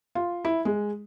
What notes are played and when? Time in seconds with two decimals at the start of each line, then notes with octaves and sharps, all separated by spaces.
0.15 F4
0.45 E4
0.65 G#3